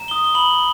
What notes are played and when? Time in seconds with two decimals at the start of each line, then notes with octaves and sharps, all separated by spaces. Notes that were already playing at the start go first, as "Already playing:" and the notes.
Already playing: A#5
0.08 D#6 G7
0.24 G7
0.35 B5 F#7